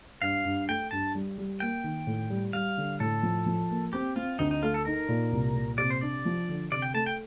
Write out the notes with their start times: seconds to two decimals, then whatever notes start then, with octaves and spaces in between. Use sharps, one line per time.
0.22 G2 F5
0.45 G2
0.68 A3 G5
0.91 G2 A5
1.15 G3
1.38 G3
1.60 A#3 G5
1.84 D#3
2.07 A2
2.30 G3
2.53 G3 F5
2.77 D3
3.00 A2 A4
3.23 F3
3.46 F3
3.70 A#3
3.93 C4 G4
4.16 C4 F4
4.39 D2 D#4
4.51 D#4
4.63 A3 F4
4.74 A4
4.85 D#4 A#4
5.09 A#2
5.32 C2
5.55 A#2
5.78 C3 D5
5.90 C5
6.01 D4 D5
6.25 F3
6.49 D3
6.72 C3 D5
6.82 G5
6.94 A3 A5
7.06 G5